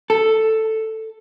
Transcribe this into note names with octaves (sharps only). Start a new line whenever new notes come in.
A4